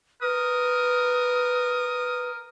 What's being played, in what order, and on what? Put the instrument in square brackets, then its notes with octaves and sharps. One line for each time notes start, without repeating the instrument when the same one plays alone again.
[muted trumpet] A#4 [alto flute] B4 [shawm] D#6